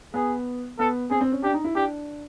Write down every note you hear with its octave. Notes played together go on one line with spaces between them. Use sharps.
B3 G#4
B3 A4
C4 G#4
C4
C#4
D4 G4
D#4
E4
D4 G4